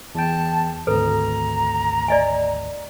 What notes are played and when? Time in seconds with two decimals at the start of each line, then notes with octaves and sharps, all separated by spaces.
0.15 E2 G5 A5
0.87 G#1 D2 A4 B4 A#5
2.08 D5 D#5 G#5